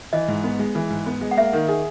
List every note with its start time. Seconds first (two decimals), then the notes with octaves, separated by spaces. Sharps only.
0.13 E3 D#5
0.28 G#2
0.44 B3
0.59 G#3
0.75 E3
0.90 G#2
1.06 B3
1.21 G#3
1.31 F#5
1.37 A#3 E5
1.53 D#3
1.68 G#4